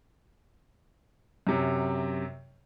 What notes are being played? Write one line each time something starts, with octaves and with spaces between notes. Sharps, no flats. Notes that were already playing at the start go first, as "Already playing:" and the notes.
F#2 C3 F#3